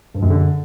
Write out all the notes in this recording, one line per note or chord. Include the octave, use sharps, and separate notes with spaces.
G2
F#2
D3